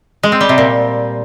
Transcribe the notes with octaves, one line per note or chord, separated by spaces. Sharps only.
G#3
C4
G3
C3
A#2